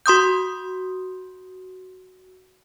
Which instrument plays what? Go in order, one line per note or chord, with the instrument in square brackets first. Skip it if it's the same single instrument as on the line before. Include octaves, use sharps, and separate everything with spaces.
[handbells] F#4 C6 D#6 G6